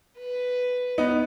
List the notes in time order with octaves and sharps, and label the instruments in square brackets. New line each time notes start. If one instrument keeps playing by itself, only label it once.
[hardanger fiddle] B4
[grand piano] B3 D#4